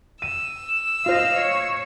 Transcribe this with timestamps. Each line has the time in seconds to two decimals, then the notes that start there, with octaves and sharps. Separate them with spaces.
0.22 E6 D#7
1.06 F4 C5 D#5 F5
1.36 C#5